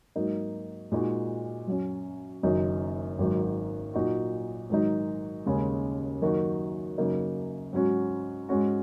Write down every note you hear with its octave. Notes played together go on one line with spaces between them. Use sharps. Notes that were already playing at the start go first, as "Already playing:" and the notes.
G#2 F#3 A#3 D#4
A#2 G#3 D#4 F#4
F#2 F#3 C#4
F#1 F#2 D#3 F#3 D#4
G#1 F#2 D#3 F#3
A#2 F#3 D#4 F#4
G#2 D#3 F#3 D#4
D#2 C#3 G#3 C#4
F#2 D#3 A#3 D#4 F#4
F#2 C#3 A#3 D#4 F#4
G#2 F#3 C#4 F#4
G#2 G#3 C#4 F#4